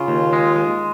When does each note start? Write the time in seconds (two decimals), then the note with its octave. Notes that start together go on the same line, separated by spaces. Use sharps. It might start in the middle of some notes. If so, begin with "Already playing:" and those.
Already playing: C#3 F4
0.08 D#2
0.33 G#3
0.56 G#3